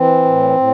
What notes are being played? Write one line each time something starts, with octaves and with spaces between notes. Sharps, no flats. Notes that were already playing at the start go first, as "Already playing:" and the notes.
Already playing: E3 C4
A2
A2